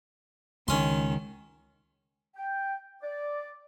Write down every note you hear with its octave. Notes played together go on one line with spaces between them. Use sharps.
C#2 D#3 C#4 C6
G5
D5